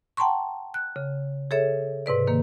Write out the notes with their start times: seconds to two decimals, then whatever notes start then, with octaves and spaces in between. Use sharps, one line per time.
0.17 F#5 G5 A5 A#5 C6 C#6
0.74 F#6
0.96 C#3
1.51 G#4 A4 C#5 E5
2.06 G#2 C3 B4 D5
2.27 D#3 A#3